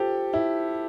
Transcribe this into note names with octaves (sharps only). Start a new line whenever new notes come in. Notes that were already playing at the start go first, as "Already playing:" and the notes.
Already playing: F4 G4 A4 C5
E4